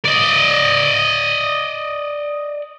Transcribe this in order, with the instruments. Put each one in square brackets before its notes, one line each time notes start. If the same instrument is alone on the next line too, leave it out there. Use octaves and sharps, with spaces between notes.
[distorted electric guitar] D5 D#5